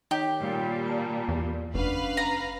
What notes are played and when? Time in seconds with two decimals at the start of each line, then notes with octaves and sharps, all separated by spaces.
0.11 D#3 G4 C#5
0.41 A#2 G3
0.86 D5 A5 A#5
1.29 E2 D5
1.74 F#1 C#4 D4 B4 F5 F#5
2.17 A#5